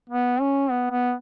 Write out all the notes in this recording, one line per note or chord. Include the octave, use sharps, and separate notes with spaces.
B3
C#4
B3
B3